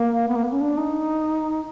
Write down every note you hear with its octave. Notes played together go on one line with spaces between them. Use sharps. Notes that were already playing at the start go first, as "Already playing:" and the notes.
Already playing: A#3
B3
A#3
B3
C#4
D4
D#4